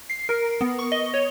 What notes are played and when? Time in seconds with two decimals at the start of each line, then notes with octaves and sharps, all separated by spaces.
0.10 C7
0.29 A#4
0.61 B3
0.79 C#6
0.92 D#5
1.14 C#5